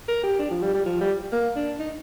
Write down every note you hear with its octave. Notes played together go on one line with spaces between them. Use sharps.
A#4
G4
D4
F3
G3
G3
F3
G3
A#3
D4
D#4